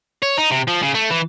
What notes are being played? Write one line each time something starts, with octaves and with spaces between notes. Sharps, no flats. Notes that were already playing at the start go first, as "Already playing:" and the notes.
C#5
D#4
C3
F3
C#3
A3
E3